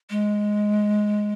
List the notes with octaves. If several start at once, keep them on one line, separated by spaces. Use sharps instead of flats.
G#3